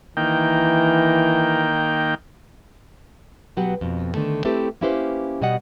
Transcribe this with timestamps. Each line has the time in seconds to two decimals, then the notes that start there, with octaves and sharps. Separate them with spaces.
0.17 D#3 E3 A#3 G5
3.57 B2 F#3 B3 G4 F#5
3.81 F2 B2
4.15 D3 D#3 A3
4.45 A3 C4 E4 G4 A4 B4
4.81 A#3 C#4 E4 G4 B4 C5
5.42 B2 G3 B3 D#5 F#5